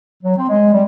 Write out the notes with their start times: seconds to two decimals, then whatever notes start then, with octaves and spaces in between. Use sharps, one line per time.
0.23 F#3
0.37 C4
0.49 G#3
0.73 G3